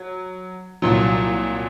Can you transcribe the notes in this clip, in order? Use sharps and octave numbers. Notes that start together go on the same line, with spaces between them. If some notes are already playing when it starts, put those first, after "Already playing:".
Already playing: F#3
C2 A#2 F#3